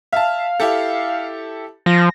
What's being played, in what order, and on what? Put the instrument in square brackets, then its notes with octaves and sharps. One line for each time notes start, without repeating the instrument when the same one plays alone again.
[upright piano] E5 A5 [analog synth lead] F5
[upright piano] E4 G4 A4
[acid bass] F3 [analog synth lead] A#6